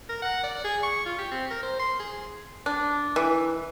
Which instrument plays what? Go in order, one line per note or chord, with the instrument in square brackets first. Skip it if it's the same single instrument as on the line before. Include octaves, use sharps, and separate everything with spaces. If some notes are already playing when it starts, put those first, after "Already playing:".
[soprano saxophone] A#4
F#5
D5
G#4
C#6
F4
G4
C4
A#4
C5
C6
G#4
[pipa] D4
E3